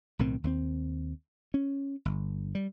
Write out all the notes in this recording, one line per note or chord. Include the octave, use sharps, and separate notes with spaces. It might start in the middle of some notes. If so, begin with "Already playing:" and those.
B1 A2 D#3 C4
D#2 A3 C4
C#4
G1
G3